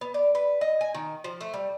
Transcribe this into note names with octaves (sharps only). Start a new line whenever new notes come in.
B3
D5
B4
D#5
G#5
D#3
F3
A3
G3